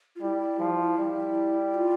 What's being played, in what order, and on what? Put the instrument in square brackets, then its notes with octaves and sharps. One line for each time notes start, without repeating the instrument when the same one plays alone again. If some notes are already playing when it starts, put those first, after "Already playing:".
[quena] F4
[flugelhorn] G3 [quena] E4
[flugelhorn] F3
G3
[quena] F4